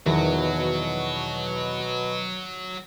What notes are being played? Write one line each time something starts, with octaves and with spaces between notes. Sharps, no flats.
E2 B2 D#3 F3 F#3